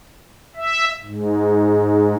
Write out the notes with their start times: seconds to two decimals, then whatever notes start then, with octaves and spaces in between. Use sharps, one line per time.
0.56 E5
1.04 G#2